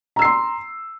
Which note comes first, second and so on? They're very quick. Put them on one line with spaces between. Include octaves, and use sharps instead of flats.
A#5 E6 C7 C6